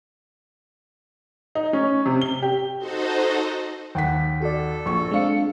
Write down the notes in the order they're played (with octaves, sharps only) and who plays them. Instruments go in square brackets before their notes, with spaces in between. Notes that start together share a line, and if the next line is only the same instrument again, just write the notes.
[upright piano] D#4
C#4
C3
G7
G4
[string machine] D#4 F#4 A4 C5 D#5
[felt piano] D#2 F#5 B6 [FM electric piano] G5
[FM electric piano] F#4 D5 [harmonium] A4
[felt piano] A#1 C#6
[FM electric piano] G#3 D4 C#7 [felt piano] C4 F5